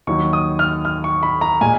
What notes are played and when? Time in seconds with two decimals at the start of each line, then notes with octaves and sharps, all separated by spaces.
0.07 D#2 D#3 F#3 C#6
0.33 D#6
0.59 F6
0.85 F6
1.04 C#6
1.23 B5
1.41 A#5
1.61 A#2 G#3 G#5